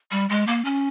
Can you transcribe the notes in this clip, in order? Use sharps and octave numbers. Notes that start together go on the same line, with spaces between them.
G3
G#3
A#3
C#4